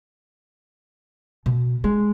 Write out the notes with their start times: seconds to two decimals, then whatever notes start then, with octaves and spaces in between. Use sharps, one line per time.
1.46 B2
1.84 G#3 D4